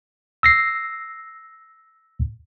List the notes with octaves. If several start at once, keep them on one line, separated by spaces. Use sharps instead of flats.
E6 A#6 C7